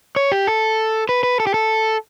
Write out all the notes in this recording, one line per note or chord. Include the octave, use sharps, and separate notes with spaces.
C#5
G4
A4
B4
B4
A4
G4
A4